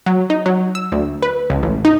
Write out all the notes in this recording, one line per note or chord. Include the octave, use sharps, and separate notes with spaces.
F#3
D#4
F#3
E6
D2
B4
C#2
A1
D#4